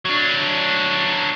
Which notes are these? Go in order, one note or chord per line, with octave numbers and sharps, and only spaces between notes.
F#3 D4